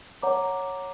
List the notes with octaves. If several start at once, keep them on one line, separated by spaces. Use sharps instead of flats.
C#5 F#5 A#5 D6